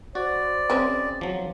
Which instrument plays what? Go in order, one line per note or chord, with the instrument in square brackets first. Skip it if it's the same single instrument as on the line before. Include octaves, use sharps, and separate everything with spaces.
[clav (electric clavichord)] F#4 [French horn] C5 [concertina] D5
[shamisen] G#3 C4 C#4
[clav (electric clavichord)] F3 F#3